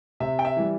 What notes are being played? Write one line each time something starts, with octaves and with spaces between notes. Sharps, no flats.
C3 E5
G5
E5
E3 G3